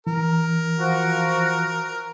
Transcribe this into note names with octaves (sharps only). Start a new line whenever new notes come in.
E3 A#4
F3 F#4